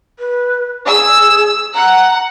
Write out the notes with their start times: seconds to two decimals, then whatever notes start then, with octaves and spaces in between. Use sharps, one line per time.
0.19 B4
0.88 G#4 E6
1.75 F#5 A#5